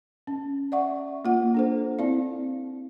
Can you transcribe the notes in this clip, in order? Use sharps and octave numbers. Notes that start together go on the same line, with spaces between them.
C#4
D5 E5 F#5 C#6
A#3 F4 F#5
D4 A4 C5
C4 E4 D5 F5